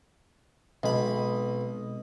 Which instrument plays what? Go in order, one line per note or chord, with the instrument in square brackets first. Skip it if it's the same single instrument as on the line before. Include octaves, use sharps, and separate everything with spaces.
[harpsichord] B1 B5 [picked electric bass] B2 G#3 C4 [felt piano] D#5